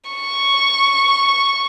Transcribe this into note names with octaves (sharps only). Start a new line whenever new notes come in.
C#6